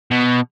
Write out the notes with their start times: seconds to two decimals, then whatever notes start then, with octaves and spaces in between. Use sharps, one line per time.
0.11 B2